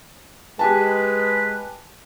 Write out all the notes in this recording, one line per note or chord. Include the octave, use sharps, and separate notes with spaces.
G#3 G4 B4 G#5 A5